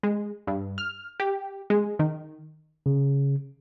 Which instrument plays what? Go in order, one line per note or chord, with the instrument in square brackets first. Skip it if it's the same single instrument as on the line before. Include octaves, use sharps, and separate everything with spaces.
[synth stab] G#3
G2
F6
G4
G#3
D#3
[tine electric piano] C#3